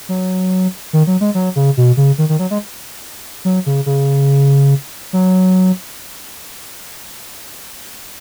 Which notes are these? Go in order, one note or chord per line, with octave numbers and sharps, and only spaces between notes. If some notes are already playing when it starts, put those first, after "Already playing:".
F#3
D#3
F#3
G#3
F#3
C#3
B2
C#3
D#3
D#3
F#3
G#3
F#3
C#3
C#3
F#3